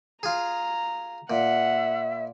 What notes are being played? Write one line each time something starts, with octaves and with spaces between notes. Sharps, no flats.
F4 G#4 A#5
A#2 E5 F#5